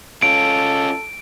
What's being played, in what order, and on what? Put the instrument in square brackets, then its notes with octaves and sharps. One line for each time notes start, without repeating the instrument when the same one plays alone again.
[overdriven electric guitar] C#4 F4 [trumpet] A4 [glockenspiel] D7